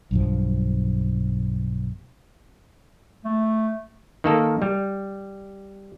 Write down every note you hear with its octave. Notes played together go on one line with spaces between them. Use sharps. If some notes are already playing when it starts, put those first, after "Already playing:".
B1 G2 F3
A3
D#3 A#3 A4
G3